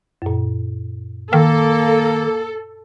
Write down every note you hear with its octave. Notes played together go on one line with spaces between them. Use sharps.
F#2 A#2
D#3 A#3 A4